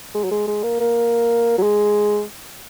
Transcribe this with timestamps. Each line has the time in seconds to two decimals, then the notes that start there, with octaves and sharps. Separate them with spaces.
0.14 G#3
0.24 F#3
0.31 G#3
0.48 G#3
0.63 A#3
0.80 A#3
1.58 F#3
1.63 G#3